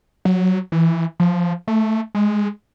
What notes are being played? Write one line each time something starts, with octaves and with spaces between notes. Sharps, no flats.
F#3
E3
F3
A3
G#3